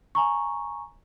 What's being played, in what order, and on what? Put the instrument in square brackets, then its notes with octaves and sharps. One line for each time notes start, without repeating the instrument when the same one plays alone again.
[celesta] G#5 A#5 C#6